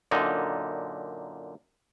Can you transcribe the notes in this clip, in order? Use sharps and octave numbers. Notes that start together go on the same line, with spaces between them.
F#2 A#2 D3 D#4